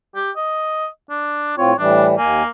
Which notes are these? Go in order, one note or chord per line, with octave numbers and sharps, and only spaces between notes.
G4
D#5
D4
A2 C4 F4 C#5
A2 E3 G3 D4
D#2 A#3 G#5